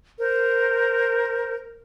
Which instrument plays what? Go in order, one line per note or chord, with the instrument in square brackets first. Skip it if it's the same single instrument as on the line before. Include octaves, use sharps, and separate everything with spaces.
[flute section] A#4 C5